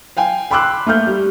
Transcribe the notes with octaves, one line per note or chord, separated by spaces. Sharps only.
F5 G5 G#5
G5 B5 C6 D6 E6 F#6
A3 A#3 F6 G6
G3